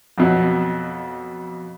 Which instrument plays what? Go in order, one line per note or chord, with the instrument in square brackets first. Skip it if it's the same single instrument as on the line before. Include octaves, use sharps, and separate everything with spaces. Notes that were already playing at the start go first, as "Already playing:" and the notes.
[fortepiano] F2 B2 F#3